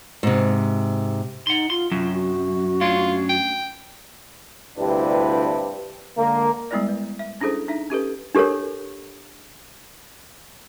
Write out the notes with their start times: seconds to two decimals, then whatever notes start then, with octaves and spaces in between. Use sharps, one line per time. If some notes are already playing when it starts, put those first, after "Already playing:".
0.23 G#2 C3
1.47 D#4 F#5 C6
1.70 F4 C6
1.92 F#2 C3 F#3 F4
2.13 F#4
2.81 A3 C#4 D4 F4
3.29 G5
4.78 D2 G2 C3 D4 E4 B4
6.18 D3 G#3 A#3
6.71 G3 G#3 B3 E4 A#4 D5
6.88 B4
7.19 E5
7.41 C#4 D4 E4 G#4 A4 C5
7.68 D4 D#4 E5
7.90 C#4 G4 A4 B4
8.35 D4 G4 A4 A#4 C#5